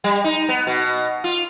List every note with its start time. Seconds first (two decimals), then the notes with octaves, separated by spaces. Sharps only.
0.04 G3
0.24 D#4
0.49 B3
0.67 B2
1.24 F4